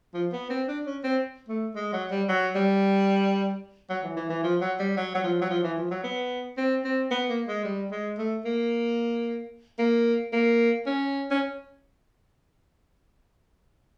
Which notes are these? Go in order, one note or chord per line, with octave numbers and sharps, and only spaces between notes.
F3
B3
C4
D4
C#4
C4
A3
G#3
F#3
G3
F#3
G3
F#3
E3
E3
E3
F3
F#3
G3
F#3
F#3
F3
F#3
F3
E3
F3
F#3
B3
C4
C4
B3
A#3
G#3
G3
G#3
A3
A#3
A#3
A#3
C#4
C#4